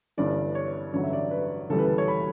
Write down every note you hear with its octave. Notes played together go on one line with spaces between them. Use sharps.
G1 G2 E3 D5
C#5
A1 G2 D3 F#3 C#5
E5
D5
B4
E1 D2 C#3 E3 G3 A4
B4
A4
C#5
B5